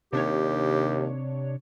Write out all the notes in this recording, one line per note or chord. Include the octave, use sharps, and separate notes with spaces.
D#2 C3 D4 G4 C#5